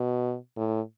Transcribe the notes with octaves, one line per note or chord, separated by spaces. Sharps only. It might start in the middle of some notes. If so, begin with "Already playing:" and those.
Already playing: B2
A2